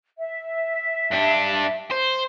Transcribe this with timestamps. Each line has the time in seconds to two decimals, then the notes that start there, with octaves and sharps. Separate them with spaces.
0.17 E5
1.11 G2 D4
1.91 C5